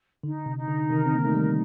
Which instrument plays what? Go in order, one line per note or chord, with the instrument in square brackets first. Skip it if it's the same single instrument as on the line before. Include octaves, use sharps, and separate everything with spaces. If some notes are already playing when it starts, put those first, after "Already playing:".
[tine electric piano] D3 [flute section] D#4
[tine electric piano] C3
[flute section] D#4
[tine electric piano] D3
[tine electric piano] C3 D#3 [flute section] A#4
[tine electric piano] C4
A#3
[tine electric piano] A3 [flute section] D#4
[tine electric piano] D#3 G3